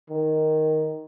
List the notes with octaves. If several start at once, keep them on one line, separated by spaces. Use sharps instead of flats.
D#3